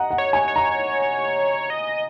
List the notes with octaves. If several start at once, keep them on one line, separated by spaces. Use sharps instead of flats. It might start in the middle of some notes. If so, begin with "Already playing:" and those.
Already playing: D#5 F#5 A#5
F#5
C#5
G#5
C#5
A#5
D#5